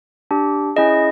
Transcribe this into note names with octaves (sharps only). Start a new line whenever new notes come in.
D4 G4
C#4 E4 G#4 D#5